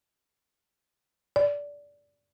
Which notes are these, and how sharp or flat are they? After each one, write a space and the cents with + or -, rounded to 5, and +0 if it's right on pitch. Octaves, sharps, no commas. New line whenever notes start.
D5 -15